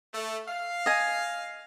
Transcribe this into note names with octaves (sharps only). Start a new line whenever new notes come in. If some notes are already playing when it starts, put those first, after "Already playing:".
A3
F5
D#5 G#5